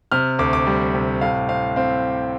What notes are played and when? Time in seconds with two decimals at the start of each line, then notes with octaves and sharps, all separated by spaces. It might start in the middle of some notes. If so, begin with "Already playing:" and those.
0.12 C3 F6
0.39 D2 D6
0.53 D6
0.67 G3
0.95 C3
1.21 A2 F5
1.49 C4 F5
1.76 C4 F5